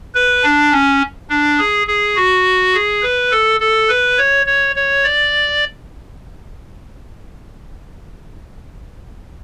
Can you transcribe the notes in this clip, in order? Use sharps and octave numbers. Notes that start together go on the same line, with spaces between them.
B4
D4
C#4
D4
G#4
G#4
F#4
G#4
B4
A4
A4
B4
C#5
C#5
C#5
D5